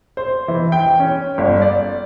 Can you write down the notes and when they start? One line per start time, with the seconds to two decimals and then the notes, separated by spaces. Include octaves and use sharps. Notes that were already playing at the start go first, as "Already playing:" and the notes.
0.17 C5
0.48 E3
0.72 G5
1.00 C#4
1.38 G1
1.62 D5